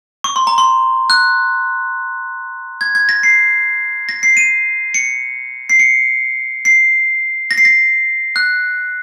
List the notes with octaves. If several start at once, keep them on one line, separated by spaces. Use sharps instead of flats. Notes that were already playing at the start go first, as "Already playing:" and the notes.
C#6
C6
A#5
C6
F#6
G#6
G#6
A#6
C7
A#6
C7
D#7
C#7
C7
C#7
C7
A#6
C7
A#6
F#6